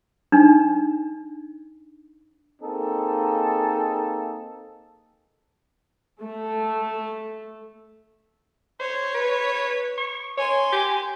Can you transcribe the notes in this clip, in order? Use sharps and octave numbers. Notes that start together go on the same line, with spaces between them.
D4 D#4
A#3 C4 D#4 G#4 A4
A3
C5 C#5
B4
C#6
C#5 G#5 C6
G4